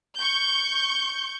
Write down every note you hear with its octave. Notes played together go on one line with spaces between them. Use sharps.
C#6 G6